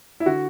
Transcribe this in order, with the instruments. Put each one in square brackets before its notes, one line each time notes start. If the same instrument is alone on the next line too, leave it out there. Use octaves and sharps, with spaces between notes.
[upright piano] E4
D3 F#4